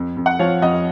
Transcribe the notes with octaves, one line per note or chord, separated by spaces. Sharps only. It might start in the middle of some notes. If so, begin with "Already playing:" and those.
Already playing: F2
F2
F#5
F3 C#5 F5
F2 D#5 F#5